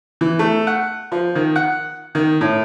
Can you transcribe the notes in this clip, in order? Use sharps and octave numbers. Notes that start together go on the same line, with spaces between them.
E3
A3
F#5
F3
D#3
F#5
D#3
A2